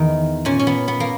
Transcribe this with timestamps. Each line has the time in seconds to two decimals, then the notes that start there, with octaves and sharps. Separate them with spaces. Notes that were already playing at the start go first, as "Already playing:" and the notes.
Already playing: E2 D#3 D#4
0.45 A#2 C#4
0.59 C#4
0.67 B3
0.88 B3
1.00 A#3